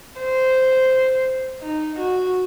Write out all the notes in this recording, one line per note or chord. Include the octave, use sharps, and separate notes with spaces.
C5
D#4
F#4